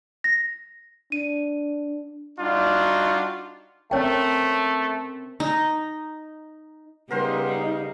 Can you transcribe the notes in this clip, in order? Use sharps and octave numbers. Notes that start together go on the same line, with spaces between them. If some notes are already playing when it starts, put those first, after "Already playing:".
A#6
D4 D#7
G3 D4 D#4 F4 F#4
A3 C4 C#4 A#4 C#5 G5
D#4
C#3 G3 B3 D#4 A#4 C5 C6